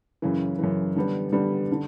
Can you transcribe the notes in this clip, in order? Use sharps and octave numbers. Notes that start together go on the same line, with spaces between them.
F#2 C#3 E3
F#2 C#3 E3
D3 G3 B3
D3 G3 B3
D3